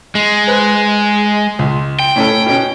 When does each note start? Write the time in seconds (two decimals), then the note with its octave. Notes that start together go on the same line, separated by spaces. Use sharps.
0.15 G#3
0.47 B4 C5
1.59 C#2
1.99 G5
2.16 A2 C#4 A4
2.46 B2 C#4